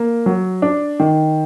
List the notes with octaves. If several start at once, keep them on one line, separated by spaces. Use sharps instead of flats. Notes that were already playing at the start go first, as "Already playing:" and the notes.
Already playing: A#3
F#3
D4
D#3